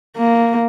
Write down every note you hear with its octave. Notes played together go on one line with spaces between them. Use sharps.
A#3